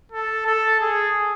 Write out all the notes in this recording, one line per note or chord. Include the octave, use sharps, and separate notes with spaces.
A4
A4
G#4